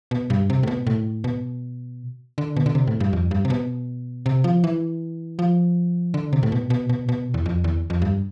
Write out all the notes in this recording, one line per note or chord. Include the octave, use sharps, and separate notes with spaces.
B2
G2
C3
A2
B2
A2
B2
D3
B2
D3
C3
A2
G2
F2
G2
C3
B2
C3
F3
E3
F3
D3
C3
A2
B2
B2
B2
B2
E2
F2
E2
F2
G2